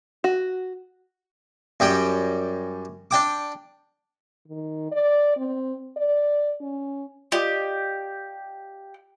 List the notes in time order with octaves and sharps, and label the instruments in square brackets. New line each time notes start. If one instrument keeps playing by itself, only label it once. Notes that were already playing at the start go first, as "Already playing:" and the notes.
[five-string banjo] F#4
[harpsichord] F#2 G3 G5
D4 G5 D6
[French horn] D#3
D5
C4
D5
C#4
[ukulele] F4 D5 D#5 [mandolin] G4